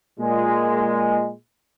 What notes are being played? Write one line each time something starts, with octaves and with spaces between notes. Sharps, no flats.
A#2 G#3